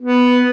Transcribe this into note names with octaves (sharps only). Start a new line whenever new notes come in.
B3